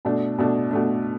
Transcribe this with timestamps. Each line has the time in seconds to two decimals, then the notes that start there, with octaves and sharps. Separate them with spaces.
0.05 B2 A3 D4
0.38 B2 A3 D4
0.71 B2 A3 D4